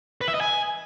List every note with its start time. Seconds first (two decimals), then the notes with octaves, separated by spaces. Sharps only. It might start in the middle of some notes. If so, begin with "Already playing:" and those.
0.21 B4
0.28 E5
0.34 D#5
0.41 G#5